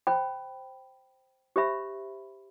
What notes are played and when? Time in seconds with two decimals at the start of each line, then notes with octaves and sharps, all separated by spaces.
0.07 C5 G5 B5
1.56 G4 C5 E5 B5